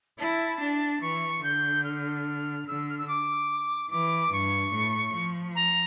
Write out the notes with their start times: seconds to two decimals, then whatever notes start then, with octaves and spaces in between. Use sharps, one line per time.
0.19 E4 A5
0.61 D4
1.02 E3 C#6
1.43 D3 G6
1.84 F6
2.67 D3 E6
2.89 F6
2.98 E6
3.08 D6
3.90 E3 D6
4.31 G2 C#6
4.73 A2
5.15 F3
5.55 A#5